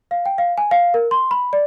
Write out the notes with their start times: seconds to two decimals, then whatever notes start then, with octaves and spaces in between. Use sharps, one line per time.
0.11 F5
0.26 G5
0.38 F5
0.58 G#5
0.71 F5
0.94 A#4
1.11 C6
1.31 B5
1.53 D5